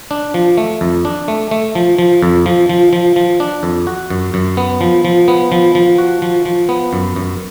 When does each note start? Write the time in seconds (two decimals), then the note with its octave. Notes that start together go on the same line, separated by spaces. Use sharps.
0.11 D4
0.34 F3
0.57 A3
0.81 F2
1.05 D4
1.28 A3
1.51 A3
1.75 F3
1.99 F3
2.22 F2
2.46 F3
2.69 F3
2.93 F3
3.16 F3
3.40 D4
3.63 F2
3.87 F#4
4.10 F#2
4.34 F#2
4.57 B3
4.81 F3
5.05 F3
5.28 B3
5.52 F3
5.75 F3
5.98 F#4
6.22 F3
6.45 F3
6.69 B3
6.93 F#2
7.16 F#2